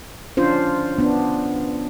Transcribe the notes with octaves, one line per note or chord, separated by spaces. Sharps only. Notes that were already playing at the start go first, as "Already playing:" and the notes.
C#4 D4 F4 C5
B3 D4